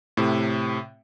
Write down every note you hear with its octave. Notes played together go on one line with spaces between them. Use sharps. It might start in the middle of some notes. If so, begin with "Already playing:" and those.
A2 C3